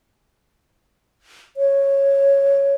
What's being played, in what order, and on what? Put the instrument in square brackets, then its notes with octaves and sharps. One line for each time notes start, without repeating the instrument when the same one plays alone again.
[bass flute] C#5